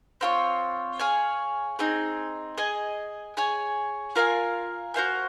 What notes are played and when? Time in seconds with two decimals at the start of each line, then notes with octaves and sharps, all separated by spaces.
0.21 C4 F4 A#4 C#5
0.99 G#4 C#5 F5 G#5
1.79 C4 D#4 G#4
2.58 G#4 D#5 G#5
3.37 G#4 C#5 G#5
4.16 F4 A#4 F5 G#5
4.94 F#4 C5 F5 G#5